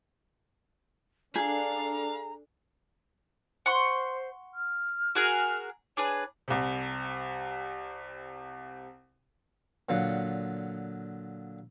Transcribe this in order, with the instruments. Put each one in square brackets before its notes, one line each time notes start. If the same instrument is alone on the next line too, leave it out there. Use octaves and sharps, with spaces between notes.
[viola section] D4 A4 [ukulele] G#4 [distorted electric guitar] F5 [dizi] A#5
[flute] C5 [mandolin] F#5 C6 C#6
[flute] F6
[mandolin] F#4 G#4 A#4
[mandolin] D4 G#4 B4 [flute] C#5
[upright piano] C2 C3
[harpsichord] A#2 D3 F#3 F4 F5 F#5